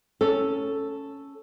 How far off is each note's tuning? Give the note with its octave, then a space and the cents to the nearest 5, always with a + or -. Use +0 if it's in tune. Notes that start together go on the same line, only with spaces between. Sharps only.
C#4 +0 A4 +0